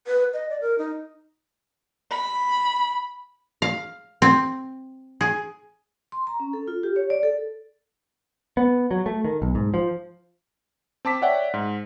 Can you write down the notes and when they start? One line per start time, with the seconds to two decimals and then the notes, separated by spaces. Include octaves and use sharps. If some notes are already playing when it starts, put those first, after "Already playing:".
0.07 B4
0.33 D#5
0.50 D5
0.61 A#4
0.78 D#4
2.11 B5
3.62 F5
4.22 C4
5.21 G#4
6.12 C6
6.27 A#5
6.40 C#4
6.53 A4
6.68 F4
6.83 G4
6.96 C#5
7.10 D5
7.23 A4
8.57 B3
8.91 F#3
9.06 A3
9.25 D#3
9.42 B1
9.55 G#2
9.74 F3
11.05 C4 A5 D6 B6
11.22 C#5 D5 E5 F#5 G5
11.54 G#2